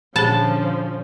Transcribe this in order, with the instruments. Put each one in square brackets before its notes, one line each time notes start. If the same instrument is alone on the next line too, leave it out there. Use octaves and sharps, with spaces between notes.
[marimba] A#2 G#4 [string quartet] D3 F3 C#4 [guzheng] A5